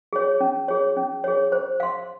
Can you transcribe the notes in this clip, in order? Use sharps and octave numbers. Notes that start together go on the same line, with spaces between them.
G#4 C#5
C#4
G#4 C#5
C#4
G#4 C#5
C5
F5 C6